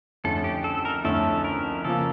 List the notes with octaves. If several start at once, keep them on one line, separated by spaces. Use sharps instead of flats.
F2 D3 A3 C#4 E4 A4
G4
A4
A#4
F2 D3 A3 C#4 E4 A4
A#4
C#3 F3 A#3 A4